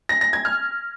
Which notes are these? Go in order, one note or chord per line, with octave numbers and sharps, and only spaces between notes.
A#6
A#6
G#6
F6